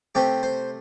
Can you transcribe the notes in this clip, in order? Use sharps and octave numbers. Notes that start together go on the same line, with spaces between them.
C3 A3 C4 G4
C5